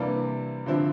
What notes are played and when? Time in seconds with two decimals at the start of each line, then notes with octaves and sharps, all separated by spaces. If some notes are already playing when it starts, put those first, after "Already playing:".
Already playing: C3 E3 G3 A#3 D4
0.66 G2 D3 F3 C4 E4